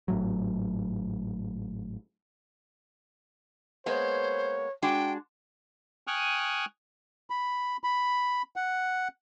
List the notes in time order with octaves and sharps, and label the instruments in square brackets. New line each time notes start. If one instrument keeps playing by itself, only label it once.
[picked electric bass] G#1 A2 F#3
[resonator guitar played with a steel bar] G#3 A#3 B3 [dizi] C5 [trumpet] C#5
[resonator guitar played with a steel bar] G#3 D4 F#4 [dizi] G5
[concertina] G5 G#5 C#6 D#6 F6 F#6
[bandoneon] B5
B5
F#5